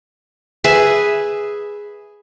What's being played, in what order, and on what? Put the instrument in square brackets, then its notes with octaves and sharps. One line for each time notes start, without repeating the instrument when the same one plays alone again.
[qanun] G#4 B4 E5 G#5